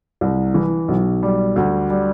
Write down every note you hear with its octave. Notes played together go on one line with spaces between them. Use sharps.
C2
E3
B1
G3
D2
G3